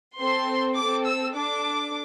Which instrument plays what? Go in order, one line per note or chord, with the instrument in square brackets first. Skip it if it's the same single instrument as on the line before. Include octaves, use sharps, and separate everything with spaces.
[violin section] C4 A4 C6
C4 A4 D6
E6
D4 A4 D6